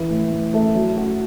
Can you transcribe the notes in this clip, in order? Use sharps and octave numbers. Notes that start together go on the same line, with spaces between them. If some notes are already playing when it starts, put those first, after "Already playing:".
Already playing: E3
A2
A2
A3
F#3
F#4